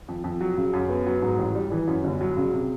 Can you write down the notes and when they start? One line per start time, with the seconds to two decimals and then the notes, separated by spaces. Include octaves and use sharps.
0.08 F2
0.24 F2
0.41 F#3
0.57 C#3
0.73 F#2
0.89 B3
1.07 F#3
1.22 G#2
1.39 A1
1.55 G3
1.72 E3
1.87 F#2
2.04 G1
2.21 F#3
2.37 C#3
2.53 C3